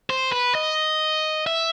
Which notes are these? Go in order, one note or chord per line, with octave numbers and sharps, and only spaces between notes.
C5
B4
D#5
E5